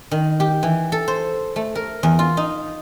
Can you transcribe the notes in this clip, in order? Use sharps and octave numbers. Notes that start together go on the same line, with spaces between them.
D#3
G4
E3
A4
C5
A3
A#4
E2
F4
D#4